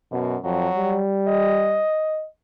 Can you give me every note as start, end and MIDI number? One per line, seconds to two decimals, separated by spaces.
0.12 0.38 42
0.12 0.36 47
0.44 0.68 41
0.44 1.00 54
0.78 1.83 55
1.28 2.25 75